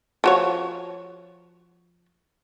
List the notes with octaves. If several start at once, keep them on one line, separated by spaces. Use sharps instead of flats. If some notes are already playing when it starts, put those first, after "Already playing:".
F3 F#4 C#5